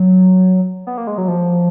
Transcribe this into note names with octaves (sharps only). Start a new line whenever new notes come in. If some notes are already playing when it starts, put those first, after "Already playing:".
Already playing: F#3
B3
A#3
G#3
F#3
F3